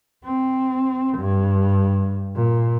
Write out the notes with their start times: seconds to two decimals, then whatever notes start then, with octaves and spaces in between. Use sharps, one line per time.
0.25 C4
1.18 G2
2.36 A#2